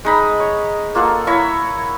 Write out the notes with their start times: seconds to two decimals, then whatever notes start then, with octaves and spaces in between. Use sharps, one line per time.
0.05 G#3 D#4 B5
0.40 C#5
0.95 A#3 F4 A4 F#5
1.27 E4 C#5 E5 A#5